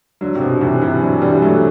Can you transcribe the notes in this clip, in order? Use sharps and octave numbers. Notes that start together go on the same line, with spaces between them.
D3 F#3
C3
B2
C3 E3
C3 E3
D3 F#3
E3 G3
G3
F#3 A3